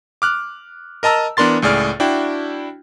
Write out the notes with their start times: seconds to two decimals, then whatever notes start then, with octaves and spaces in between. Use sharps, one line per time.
0.22 D6 F6 F#6
1.03 A#4 D#5 A5 A#5 E6
1.37 E3 B3 D4 A#4 C6 A6
1.62 C#2 A2 G#4 D5 F6
2.00 D4 E4 F#4 G5